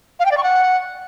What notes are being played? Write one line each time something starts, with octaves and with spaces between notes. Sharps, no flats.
F5
G5
D5
C#6
F#5